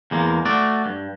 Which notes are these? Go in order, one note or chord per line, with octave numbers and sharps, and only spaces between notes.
E2 G#3 A#3
A3 F#4 D5
G2